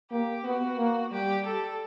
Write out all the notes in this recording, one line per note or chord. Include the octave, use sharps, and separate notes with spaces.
A#3 G4
B3 F#4
A#3
G3 G4
A4